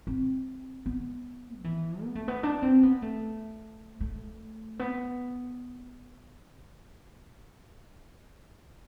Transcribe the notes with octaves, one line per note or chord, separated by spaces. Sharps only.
C4
B3
F3
E3
B3
A3
B3
D4
C4
B3
A3
A3
B3